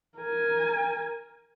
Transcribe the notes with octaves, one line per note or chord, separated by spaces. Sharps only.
A#4 G#5